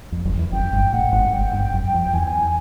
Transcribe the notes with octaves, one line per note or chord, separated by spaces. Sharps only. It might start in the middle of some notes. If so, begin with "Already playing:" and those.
F2
F#1 F#2
E2
F#1 F#2 G5
G1 G2
A1 A2 F#5
G#1 G#2
G1 G2 G5
G1 G2
F#1 F#2
F2
E2 G#5